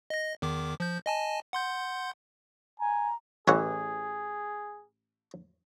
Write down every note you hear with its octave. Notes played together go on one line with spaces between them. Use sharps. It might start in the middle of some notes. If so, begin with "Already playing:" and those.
D#5 A#6
E2 D#3 D6
F3 G6
D#5 G#5 A5
F#5 C6 G6
G#5 A#5
A1 E3 G#4 C#5 F#5